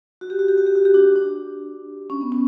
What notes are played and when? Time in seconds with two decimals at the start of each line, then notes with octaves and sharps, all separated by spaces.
0.21 F#4
0.30 G4
0.39 F#4
0.48 G4
0.58 F#4
0.66 G4
0.76 F#4
0.85 G4
0.94 D4 F#4
1.16 D4
2.10 C#4
2.21 B3
2.32 C#4